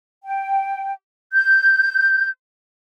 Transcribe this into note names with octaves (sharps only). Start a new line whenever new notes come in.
G5
G6